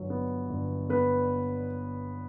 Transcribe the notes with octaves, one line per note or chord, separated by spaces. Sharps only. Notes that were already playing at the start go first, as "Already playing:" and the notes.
Already playing: G1 F#3
B3
G1
B3 B4